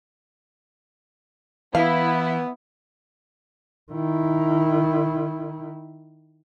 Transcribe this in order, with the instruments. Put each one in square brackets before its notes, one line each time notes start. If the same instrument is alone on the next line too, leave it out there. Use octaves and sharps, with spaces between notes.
[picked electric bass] E3 [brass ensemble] B3 [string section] E4 [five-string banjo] F5
[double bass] D#3 E4